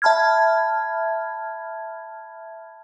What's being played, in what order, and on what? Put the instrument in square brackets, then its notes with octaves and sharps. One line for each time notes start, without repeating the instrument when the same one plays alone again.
[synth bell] E5 A5 B5 F6 G#6